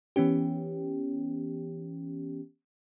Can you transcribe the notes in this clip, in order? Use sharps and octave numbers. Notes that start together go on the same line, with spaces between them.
E3 B3 C#4 G4